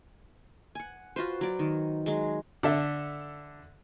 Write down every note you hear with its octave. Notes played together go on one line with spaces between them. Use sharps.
F#5 G#5
F4 F#4 B4 C5
F#3 D5
D#3
F#3 G#3
D3 A4 E5